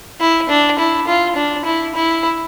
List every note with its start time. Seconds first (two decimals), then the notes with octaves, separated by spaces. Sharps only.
0.20 E4
0.49 D4
0.79 E4
1.07 F4
1.36 D4
1.65 E4
1.95 E4